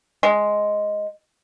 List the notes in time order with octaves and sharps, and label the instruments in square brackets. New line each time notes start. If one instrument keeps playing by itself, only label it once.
[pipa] G#3